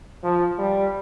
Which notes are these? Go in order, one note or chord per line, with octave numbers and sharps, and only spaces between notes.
F3
G3